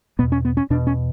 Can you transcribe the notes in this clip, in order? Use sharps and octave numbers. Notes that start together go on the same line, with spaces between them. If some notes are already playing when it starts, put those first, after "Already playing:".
E2 B2 B3
C#4
B3
C#4
E2 B2 D4
C#4